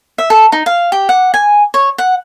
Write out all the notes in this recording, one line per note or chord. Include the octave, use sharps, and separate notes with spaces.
E5
A4
D#4
F5
G4
F#5
G#5
C#5
F#5